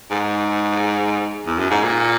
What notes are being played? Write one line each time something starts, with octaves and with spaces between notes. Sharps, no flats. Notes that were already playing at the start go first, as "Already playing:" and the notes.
G#2
E2
F#2
G#2
A#2